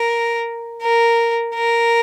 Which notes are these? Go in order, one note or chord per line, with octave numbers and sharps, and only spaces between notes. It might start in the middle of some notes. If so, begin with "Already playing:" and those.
Already playing: A#4
A#4
A#4